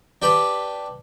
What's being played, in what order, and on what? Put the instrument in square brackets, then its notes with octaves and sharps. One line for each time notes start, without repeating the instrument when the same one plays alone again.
[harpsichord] D4 G4 B4 B5